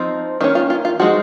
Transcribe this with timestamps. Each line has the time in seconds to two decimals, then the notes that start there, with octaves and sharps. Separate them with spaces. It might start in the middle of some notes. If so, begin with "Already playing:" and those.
Already playing: F3 C4 D#4
0.41 D#3 A#3 C#4 D#4
0.55 F4
0.70 F4
0.85 F4
1.00 F3 G#3 D#4 F#4